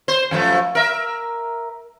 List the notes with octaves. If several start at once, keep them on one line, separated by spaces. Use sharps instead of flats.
C5
F#2 F3 A3
A#4 E5